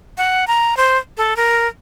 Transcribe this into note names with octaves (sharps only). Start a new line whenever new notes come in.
F#5
A#5
C5
A4
A#4